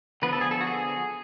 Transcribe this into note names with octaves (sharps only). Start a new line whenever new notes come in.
D3 F3 B3 B4
A4
G#4
A4
F#4
G#4